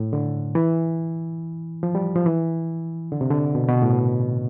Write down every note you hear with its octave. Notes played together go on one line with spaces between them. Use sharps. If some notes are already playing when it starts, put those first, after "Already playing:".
Already playing: A2
D3
E3
F3
G3
F3
E3
D3
C3
D3
B2
B2
A2